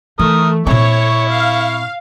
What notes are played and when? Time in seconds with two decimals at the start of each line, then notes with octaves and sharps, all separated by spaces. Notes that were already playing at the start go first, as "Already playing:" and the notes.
0.19 E3 A3 A#4 D#6
0.67 A#2 C4 E4 C#5 C#6
1.30 F5